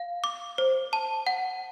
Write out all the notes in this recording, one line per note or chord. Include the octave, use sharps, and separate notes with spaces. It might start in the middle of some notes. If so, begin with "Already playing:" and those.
Already playing: F5
D6
C5
A5
F#5